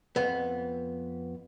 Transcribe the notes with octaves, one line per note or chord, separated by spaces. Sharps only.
F2 B3